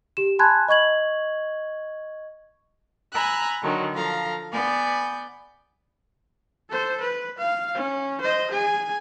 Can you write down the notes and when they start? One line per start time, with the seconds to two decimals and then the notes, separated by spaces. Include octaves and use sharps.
0.17 G4 E7
0.39 G#5 A5 B5 C6 F#6 G#6
0.68 D#5 C#6 G#6 F#7
3.13 G#5 A#5 B5 E6 F#6
3.62 D3 D#3 F#3
3.93 F3 A4 F5 A#5
4.51 B3 D5 G#5 G6
6.70 A4 C5
7.02 B4
7.38 F5
7.74 C#4
8.21 C5 D#5
8.51 G#4 G#5